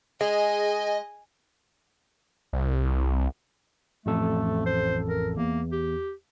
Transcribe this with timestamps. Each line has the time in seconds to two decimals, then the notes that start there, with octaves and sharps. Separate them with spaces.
0.21 G#3 G#4 D#5 G#5
2.53 C2
4.06 A1 F2 A3 A4
4.66 C5
5.09 A#4
5.37 E2 A#3
5.72 G4